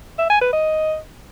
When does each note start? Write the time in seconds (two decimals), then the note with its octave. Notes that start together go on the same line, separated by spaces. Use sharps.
0.18 E5
0.30 G#5
0.41 B4
0.52 D#5